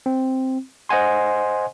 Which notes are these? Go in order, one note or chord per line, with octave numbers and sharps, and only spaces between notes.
C4
C5 D#5 F#5 G#5 C6